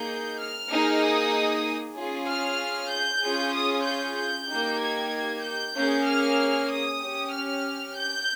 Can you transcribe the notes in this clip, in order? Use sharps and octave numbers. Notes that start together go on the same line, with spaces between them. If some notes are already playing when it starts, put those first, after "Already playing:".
Already playing: A#3 D#4 G#4 G6
F6
A#3 D#4 G#4
D#6
C#4 F4 G#4
F6
G6
C#4 F4 G#4
D#6
G6
G6
A#3 D#4 G4
G#6
G6
A#3 C#4 G#4
F6
D#6
C#4 G4
F6
G6